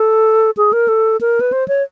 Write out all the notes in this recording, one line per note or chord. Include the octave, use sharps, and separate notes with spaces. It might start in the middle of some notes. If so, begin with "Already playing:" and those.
Already playing: A4
G#4
A#4
A4
A#4
B4
C5
C#5